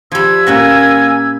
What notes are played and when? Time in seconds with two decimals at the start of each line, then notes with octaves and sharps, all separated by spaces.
0.12 F3 G3 B5 E6 G#6
0.47 A#2 A#3 C#4 F#4 G#5